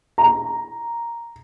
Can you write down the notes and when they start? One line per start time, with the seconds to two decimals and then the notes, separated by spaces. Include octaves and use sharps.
0.18 A#5